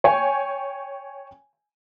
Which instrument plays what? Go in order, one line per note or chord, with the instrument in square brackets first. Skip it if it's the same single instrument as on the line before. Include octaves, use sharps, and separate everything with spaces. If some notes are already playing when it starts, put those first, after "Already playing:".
[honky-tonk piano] C#5 G5 G#5